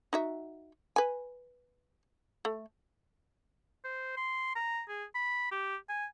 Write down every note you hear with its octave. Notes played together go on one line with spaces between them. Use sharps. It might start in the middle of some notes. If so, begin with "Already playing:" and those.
D#4 F#4 E5
B4 G#5
A3
C5
C6
A#5
G#4
B5
G4
G#5